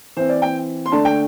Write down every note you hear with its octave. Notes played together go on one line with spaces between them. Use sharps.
E3 C4 C5
D5
G5
C6
D3 A3 D4 A5
G5